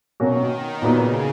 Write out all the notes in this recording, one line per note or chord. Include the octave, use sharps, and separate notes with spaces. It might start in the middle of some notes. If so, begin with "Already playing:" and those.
B2 D#3 F#3 A#3 C#4 F#4
D#3
A#2 C#3 F#3 B3 D#4